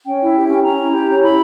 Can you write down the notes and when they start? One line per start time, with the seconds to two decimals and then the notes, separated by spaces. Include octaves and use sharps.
0.05 C#4 G5
0.20 E4
0.35 G4
0.49 C#4
0.63 C#4 A#5
0.79 E4
0.93 G4
1.07 C#4
1.22 E4 B5